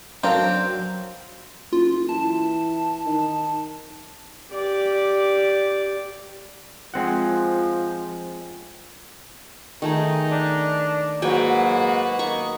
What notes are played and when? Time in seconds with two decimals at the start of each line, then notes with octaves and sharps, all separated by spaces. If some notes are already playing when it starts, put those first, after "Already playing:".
0.23 F#3 C4 D4 A#4 F5 G5 A#5
1.72 F#1 F4
2.09 E3 A5
3.06 D#3
4.52 G4 D5
6.94 F3 G#3 C4 F#5
9.82 D#3 A3 D#4 G#4
10.31 D4
11.22 G#2 F#3 A#3 F#4 B4 G5 G#5
12.19 D#3 A#5 C#6